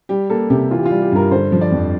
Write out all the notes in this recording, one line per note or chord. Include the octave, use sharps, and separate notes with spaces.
G3 G4
A#3 A4
C3 G4
E3 F4
G4
F4
G3
G4
G2 A#4
D3 C5
F3
D5
F2